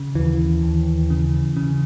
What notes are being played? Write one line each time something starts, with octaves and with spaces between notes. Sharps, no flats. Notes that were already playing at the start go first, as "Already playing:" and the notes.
Already playing: C#3
D#2 E3
D#2
C#3
C#3